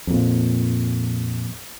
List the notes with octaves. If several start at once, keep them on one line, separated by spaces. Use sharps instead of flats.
F2 A#2